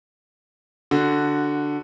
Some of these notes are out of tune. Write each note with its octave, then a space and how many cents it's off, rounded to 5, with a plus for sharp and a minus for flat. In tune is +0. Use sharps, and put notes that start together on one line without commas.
D3 +0 F#4 +0